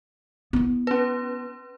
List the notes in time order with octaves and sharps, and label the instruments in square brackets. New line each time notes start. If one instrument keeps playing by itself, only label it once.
[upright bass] B3 E4
[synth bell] C#4 B4